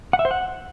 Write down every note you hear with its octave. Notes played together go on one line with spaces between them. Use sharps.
F#5
E5
C5
F#5